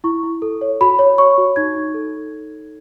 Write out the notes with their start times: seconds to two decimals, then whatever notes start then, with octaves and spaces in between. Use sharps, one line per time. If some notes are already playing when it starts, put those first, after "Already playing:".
0.04 E4 C#6
0.23 E4
0.42 A4
0.61 C#5
0.81 F#4 B5
0.99 C#5
1.18 C#5 C#6
1.38 F#4
1.56 D#4 G#6
1.76 D#4
1.94 A4